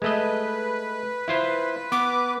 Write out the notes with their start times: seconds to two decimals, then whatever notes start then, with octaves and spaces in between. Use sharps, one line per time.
0.02 G#3 A3 B4 D#5
1.28 E4 F4 C5
1.92 B3 D6